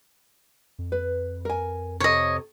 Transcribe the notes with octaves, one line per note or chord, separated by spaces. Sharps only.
F2
B4
A#4 G#5
C3 A4 C#5 D#5